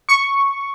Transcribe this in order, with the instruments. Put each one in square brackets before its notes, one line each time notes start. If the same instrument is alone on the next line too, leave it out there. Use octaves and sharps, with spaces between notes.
[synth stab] C#6